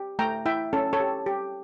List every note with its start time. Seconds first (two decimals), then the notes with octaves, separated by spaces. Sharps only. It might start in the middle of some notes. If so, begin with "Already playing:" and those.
Already playing: G4
0.19 A3 G5 A#5
0.46 E4 E5 G5
0.73 C#4 A4
0.93 A4 C#5
1.00 G4
1.26 G4